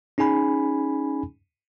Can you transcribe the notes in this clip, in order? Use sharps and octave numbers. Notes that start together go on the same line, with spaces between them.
C#4 D#4 G#4 G#5 B5